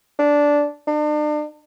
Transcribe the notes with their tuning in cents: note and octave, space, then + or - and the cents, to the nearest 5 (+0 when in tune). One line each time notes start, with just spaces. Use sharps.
D4 -10
D4 +40